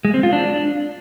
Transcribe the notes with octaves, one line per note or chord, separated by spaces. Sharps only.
G#3
C4
F4
D4